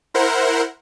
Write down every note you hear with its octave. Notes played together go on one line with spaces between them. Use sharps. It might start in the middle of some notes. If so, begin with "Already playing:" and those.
E4 A#4 C5 F#5